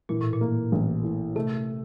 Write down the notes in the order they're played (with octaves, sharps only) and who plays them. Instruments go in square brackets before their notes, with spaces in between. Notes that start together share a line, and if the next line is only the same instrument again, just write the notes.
[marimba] A#2 [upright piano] E3
[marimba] A2
A#2
[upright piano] A#3
A1
A2
[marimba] C3 [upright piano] A3